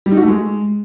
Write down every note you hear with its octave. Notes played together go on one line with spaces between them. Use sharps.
G3
D#4
F#4
A3
G#3